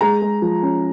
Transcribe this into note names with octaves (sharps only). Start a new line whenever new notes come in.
G#3 A#5
G#3
F3
C#4